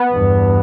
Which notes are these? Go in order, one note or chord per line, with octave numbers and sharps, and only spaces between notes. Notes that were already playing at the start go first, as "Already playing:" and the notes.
Already playing: B3
E2 G2